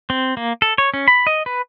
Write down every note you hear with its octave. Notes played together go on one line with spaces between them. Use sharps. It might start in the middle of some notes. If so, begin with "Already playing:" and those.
C4
A#3
A4
C#5
C#4
B5
D#5
B4